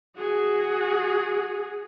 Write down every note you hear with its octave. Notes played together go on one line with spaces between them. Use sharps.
F#4 G#4